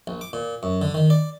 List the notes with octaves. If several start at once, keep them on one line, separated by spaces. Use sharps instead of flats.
A#1
D6
A#2
F#2
D3
D#3
D5